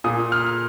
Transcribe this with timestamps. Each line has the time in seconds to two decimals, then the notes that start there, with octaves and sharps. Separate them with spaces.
0.04 A#2 D#6
0.32 F6